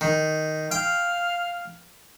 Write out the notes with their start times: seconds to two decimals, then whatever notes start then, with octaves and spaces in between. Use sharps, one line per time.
0.01 D#3
0.72 F5 G5